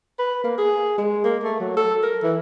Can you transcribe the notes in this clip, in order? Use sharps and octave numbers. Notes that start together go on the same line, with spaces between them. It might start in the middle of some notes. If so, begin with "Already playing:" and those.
B4
A#3
G#4
G#3
A#3
A3
F#3
A4
A#4
E3